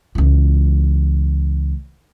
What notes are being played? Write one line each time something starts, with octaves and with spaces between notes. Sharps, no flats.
C#2 E3